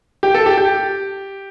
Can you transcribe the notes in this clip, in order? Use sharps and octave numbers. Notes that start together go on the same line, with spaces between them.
G4
A4
G4
G4